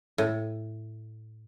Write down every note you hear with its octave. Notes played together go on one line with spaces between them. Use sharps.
A2